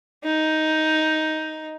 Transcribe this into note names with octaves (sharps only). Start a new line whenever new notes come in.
D#4